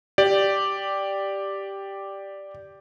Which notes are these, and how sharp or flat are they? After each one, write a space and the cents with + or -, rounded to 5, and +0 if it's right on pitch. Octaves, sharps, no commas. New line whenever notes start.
G4 +0 D5 +0